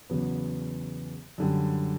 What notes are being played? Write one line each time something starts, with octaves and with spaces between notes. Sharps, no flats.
E2 C#3 F#3 B3
F#2 D3 G3